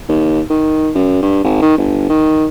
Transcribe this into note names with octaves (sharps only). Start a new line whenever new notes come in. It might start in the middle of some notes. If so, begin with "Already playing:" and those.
D#2
D#3
F#2
G2
G#1
D#3
G1
D#3